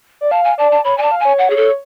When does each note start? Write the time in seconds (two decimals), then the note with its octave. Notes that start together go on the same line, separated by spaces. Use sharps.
0.21 D5
0.31 F5 A5
0.44 G#5
0.58 D5 A5
0.72 A5
0.85 C#5 B5
0.98 D5 G#5 A5
1.11 F5
1.20 C#5 G#5
1.39 F#5
1.50 G#4
1.57 A4